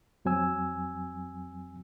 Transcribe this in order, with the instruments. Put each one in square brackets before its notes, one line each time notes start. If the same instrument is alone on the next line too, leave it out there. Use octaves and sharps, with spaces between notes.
[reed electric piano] F2 F#3 C4 G#5 E6